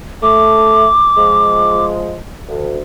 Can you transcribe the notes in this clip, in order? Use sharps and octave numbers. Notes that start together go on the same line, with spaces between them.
A3 D6
F3 G#3
D2